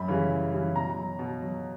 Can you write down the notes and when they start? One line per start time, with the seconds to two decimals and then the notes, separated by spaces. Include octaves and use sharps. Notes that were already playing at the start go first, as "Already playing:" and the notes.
Already playing: F#2 B5
0.08 C#3 E3 G3
0.30 F#2
0.53 C#3 E3 G3
0.74 B2 A#5
0.97 F#3
1.19 B2
1.42 F#3